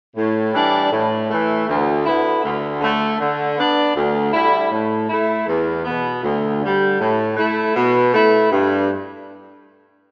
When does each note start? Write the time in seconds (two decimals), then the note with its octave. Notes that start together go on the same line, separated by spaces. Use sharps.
0.16 A2
0.53 E3 G3 D4
0.91 A2
1.29 E3 A3
1.67 D2
2.05 D3 B3 E4
2.43 D2
2.81 D3 A3
3.19 D3
3.57 B3 D4
3.95 D2
4.33 D3 G3 E4
4.71 A2
5.09 A3 E4
5.47 E2
5.84 B2 B3
6.23 D2
6.61 D3 G3
6.99 A2
7.36 A3 E4
7.75 B2
8.12 A3 E4
8.51 G2